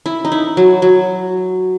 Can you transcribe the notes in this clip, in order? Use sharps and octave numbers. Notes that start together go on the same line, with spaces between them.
E4
D#4
E4
F#3
F#3